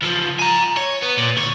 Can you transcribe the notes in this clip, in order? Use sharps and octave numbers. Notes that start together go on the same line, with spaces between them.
C#2 F3
G#5 A#5
C#5
B3
A#2
D2 C#5